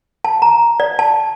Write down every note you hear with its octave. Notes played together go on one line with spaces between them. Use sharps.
A5
A#5
D5
A5